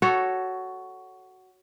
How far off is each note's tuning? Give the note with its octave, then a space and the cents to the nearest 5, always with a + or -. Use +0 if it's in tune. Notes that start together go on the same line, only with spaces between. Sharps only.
F#4 +10 A4 +0 C#5 +0